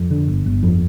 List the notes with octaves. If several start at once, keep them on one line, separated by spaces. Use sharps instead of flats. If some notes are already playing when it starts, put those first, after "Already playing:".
Already playing: F2
D3
G1
G1
F2